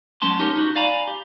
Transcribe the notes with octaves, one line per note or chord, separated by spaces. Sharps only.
F#3 A3 B3 C#4 A5 C6
D#4 G4 A#4 C#5
D#4 F4 F#4
D5 F5 G#5 A#5 B5
G4